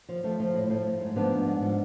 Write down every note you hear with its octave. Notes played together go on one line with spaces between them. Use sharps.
F3
F3 A3
F3
A2
F3 A3
F3
G#2
F3 B3 D4
G#2
G#2
F3